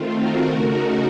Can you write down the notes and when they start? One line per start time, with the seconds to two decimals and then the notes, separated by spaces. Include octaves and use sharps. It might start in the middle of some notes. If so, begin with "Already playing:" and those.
Already playing: D#3 A3 C4 F4
0.14 F#4 A#4
0.49 C#3 A3 D#4